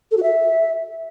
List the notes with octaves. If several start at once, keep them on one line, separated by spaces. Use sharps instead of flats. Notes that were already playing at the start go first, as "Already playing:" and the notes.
A4
F#4
E5